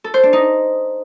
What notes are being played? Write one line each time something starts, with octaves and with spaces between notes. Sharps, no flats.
A4
C5
D4
D#4